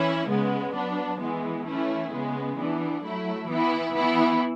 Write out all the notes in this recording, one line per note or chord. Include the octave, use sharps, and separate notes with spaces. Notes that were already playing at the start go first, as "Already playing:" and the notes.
Already playing: E3 C#4 E4
C#3 G#3 B3
F#3 B3 D4
E3 G#3 B3
E3 A3 C#4 E4
C#3 G#3 B3
E3 B3 D4
F#3 A3 E4
E3 B3 E4
E3 B3 E4